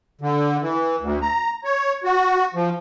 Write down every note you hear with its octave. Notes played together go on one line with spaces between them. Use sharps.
D3
E3
D2
A#5
C#5
F#4
F3